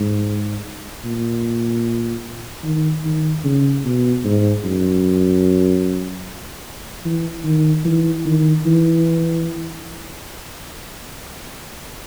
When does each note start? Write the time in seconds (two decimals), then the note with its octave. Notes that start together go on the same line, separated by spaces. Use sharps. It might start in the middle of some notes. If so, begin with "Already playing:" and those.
Already playing: G#2
1.04 A#2
2.64 D#3
3.05 D#3
3.44 C#3
3.85 B2
4.25 G#2
4.64 F#2
7.05 E3
7.45 D#3
7.85 E3
8.26 D#3
8.66 E3